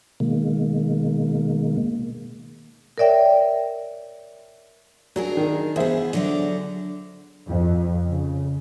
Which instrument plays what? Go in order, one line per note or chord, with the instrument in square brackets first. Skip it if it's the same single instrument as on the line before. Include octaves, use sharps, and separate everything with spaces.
[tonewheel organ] B2 D#3 G#3 A#3
[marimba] A#4 C#5 D5 E5 G5
[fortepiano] F#3 [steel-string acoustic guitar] D4 G#4 A#4
[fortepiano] D#3
[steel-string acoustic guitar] E2 B3 [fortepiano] G#4 C5 E5
[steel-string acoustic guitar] D3 F#3 D5
[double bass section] F2
C#3